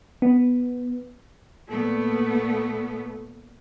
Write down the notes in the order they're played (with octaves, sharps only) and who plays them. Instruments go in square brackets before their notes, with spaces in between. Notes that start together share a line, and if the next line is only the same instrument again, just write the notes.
[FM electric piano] B3
[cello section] A#2 B3 [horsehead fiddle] A3